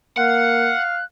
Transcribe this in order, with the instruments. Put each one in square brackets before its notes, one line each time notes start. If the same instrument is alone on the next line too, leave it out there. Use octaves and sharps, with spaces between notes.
[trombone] A#3 [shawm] F5 [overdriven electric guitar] F#5 [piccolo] F#6